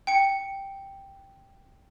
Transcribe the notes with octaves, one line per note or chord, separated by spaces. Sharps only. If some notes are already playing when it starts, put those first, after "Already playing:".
G5 C#7